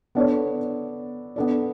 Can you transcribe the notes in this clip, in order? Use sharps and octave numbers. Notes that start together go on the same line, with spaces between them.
B3 D4 A4 C#5
B3 D4 A4 D5